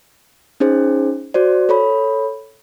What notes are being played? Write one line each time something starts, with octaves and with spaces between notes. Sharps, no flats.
C#4 D#4 G#4 C5
F#4 C5 D5
A4 C#5 B5